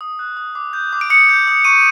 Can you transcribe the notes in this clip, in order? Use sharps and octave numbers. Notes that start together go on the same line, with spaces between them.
D#6
F#6
D#6
D6
G6
D6
D7
D#6 C#7
G6
D#6
C#6 D#7